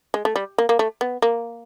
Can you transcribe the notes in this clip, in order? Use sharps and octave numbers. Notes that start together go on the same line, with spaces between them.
G#3
A3
G3
A#3
A#3
A3
B3
A#3